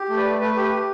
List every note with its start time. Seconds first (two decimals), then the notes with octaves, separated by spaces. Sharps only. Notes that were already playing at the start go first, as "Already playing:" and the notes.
Already playing: G4
0.09 A3
0.17 B4 D5
0.24 A3
0.40 A3 B4
0.56 G4
0.64 B4
0.72 G4